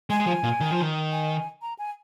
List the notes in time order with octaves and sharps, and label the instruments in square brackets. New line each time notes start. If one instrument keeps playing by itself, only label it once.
[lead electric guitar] G#3 [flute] G#5
[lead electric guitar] G#3
F3
A#2
D#3
F3
D#3
[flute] G#5
A#5
G#5